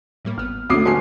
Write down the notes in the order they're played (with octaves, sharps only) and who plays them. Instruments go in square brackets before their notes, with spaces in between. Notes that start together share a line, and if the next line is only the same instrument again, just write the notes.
[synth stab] A2 G3 A#3
[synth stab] G#1 B3 [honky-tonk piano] F6
[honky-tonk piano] D2 A3 [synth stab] B3 C#4 D4 [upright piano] D6 D#6 C7
[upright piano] G1 G#5 C7 [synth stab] C#4 G4